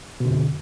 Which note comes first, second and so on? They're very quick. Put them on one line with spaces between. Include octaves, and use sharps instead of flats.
B2 D3 F2